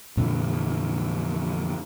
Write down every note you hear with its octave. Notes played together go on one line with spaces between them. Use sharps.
F2 A#2 D3 E3